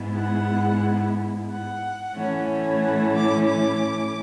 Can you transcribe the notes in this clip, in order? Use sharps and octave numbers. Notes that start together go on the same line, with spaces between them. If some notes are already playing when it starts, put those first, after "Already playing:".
Already playing: G#2 G#3 B3 E4
F#5
F#5
A2 E3 A3 C#4 E4
F#5
D6
D6